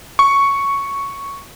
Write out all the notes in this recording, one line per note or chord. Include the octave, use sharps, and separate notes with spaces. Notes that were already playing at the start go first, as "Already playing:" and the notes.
C#6